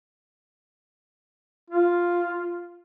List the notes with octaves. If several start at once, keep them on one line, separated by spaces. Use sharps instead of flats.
F4